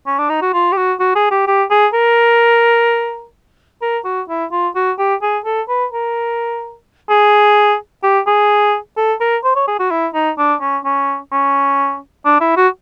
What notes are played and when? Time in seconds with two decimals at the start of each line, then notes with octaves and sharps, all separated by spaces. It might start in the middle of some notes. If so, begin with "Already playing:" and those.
0.07 C#4
0.18 D4
0.30 D#4
0.42 F#4
0.53 F4
0.72 G4
0.77 F#4
1.00 F#4
1.16 G#4
1.31 G4
1.47 G4
1.71 G#4
1.94 A#4
3.82 A#4
4.05 F#4
4.29 E4
4.52 F4
4.75 F#4
4.98 G4
5.22 G#4
5.45 A4
5.69 B4
5.93 A#4
7.09 G#4
8.03 G4
8.27 G#4
8.97 A4
9.21 A#4
9.44 C5
9.56 C#5
9.68 G#4
9.79 F#4
9.91 E4
10.14 D#4
10.38 D4
10.61 C#4
10.85 C#4
11.32 C#4
12.25 D4
12.41 E4
12.57 F#4